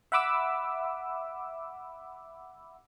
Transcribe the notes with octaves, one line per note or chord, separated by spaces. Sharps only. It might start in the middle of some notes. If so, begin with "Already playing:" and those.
E5 F#5 B5 D6 E6